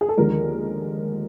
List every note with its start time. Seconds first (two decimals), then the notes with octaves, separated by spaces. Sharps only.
0.01 G#4
0.09 A4
0.17 D#2 D3 F3 G#3 A#4